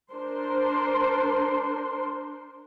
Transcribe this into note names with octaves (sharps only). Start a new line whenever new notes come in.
D4 A#4 C5 C6